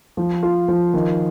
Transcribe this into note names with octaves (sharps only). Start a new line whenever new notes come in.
F3
F4
F3
D#3